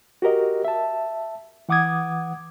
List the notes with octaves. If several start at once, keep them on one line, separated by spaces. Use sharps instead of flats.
F#4 G4 A#4 D#5
E5 A5
E3 F#5 D6 D#6 G#6